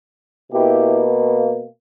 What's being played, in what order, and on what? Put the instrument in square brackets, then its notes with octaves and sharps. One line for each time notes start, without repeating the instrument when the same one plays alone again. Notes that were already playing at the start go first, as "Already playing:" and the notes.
[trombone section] B2 A#3 E4 G4